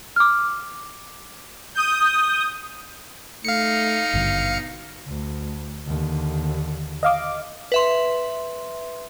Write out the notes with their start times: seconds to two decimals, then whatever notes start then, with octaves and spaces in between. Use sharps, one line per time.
0.16 D6 F6
1.75 D#6 G6
3.45 A3 D#4 F5 C#7
4.14 G#1 G2 B2 D3
5.07 D2
5.86 D#2 D3
7.03 D#5 F5 D6
7.72 B4 E5 C6